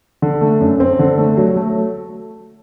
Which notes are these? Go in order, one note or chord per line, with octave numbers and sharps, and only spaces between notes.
D3
A3
F#2
C4
D3
A3
F#3
A3